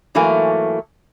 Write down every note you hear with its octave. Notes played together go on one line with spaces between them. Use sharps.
G#2 E3 F#3 A3 A#3 G#5